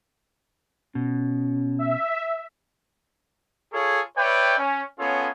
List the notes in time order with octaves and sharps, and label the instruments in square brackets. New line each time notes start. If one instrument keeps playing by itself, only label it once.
[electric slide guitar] B2 [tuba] C#4
[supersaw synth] E5
[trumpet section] F4 G#4 A4 C#5
B4 C#5 D5 E5 G5
C#4
B3 C#4 F4 G#4 A4 C#5